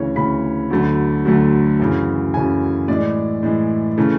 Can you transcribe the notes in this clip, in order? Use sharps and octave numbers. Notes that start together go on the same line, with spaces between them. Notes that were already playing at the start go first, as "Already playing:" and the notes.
Already playing: D2 C#3 E3 C#5
D2 C#3 E3 B5
D2 D3 F#3 A3
D2 D3 F#3 A3
F#2 C#3 E3
F#2 C#3 E3 G#5
A2 E3 G#3 D5
A2 E3 G#3
C#3 E3 A3